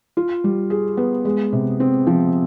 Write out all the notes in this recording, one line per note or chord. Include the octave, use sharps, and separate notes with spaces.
F4
G3
G#4
B3
G#3
C3
C4
F3